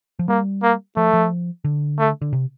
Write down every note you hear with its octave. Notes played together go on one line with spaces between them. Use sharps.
F3
G3 A#3
A#3
F3 A3
F3
D3
A3
D3
C3